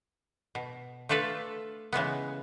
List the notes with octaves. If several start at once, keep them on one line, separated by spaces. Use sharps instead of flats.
B2
A3 D4 F4 A4 B4
C#3 E3 G#3 B3